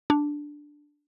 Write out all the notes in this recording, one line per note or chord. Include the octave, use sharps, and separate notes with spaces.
D4